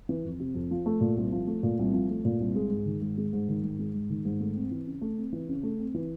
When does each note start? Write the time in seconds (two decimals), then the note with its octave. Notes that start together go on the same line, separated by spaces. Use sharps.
0.09 E3
0.24 F2
0.40 C3
0.54 F2
0.71 F3
0.86 A3
1.01 A#2
1.17 C2
1.32 F3
1.47 A3
1.63 A#2
1.79 C2
1.93 F3
2.09 A3
2.25 A#2
2.40 C2
2.56 G#3
2.70 G#2
2.86 D#3
3.02 G#2
3.18 G#3
3.33 G#2
3.48 D#3
3.64 G#2
3.79 G#3
3.94 G#2
4.10 D#3
4.25 G#2
4.40 A3
4.55 C4
4.71 E3
4.87 C#3
5.01 A3
5.18 C4
5.33 E3
5.48 C#3
5.63 A3
5.79 C4
5.94 E3